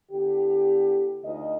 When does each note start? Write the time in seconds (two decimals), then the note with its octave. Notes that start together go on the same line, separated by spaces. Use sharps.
0.11 D3 B3 E4 G4
1.24 D2 D#4 F4 D#5